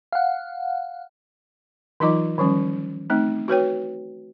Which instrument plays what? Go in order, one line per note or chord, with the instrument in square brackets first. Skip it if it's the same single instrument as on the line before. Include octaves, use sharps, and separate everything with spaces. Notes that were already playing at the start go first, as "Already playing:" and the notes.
[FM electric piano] F5 F#5
[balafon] E3 F#3 D#4 F4 D#5 D6
D#3 F3 G3 C#4
A3 C4 D#4
F#4 B4 C#5 G5